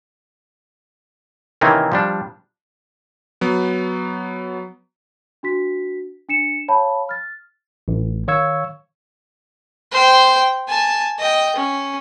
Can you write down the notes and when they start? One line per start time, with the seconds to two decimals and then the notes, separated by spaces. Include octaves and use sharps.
1.61 C3 D#3 E3 A#3 C4 C#4
1.92 F3 G3 D4
3.41 F#3 B3
5.43 D4 F#4 B6
6.29 D4 C#7 E7
6.68 C#5 F5 A5 B5
7.09 F6 A6
7.88 A1
8.28 D#3 C#5 F5 C#6 E6 G#6
9.92 C5 G5
10.68 G#5 A5
11.19 D#5 G5
11.56 C#4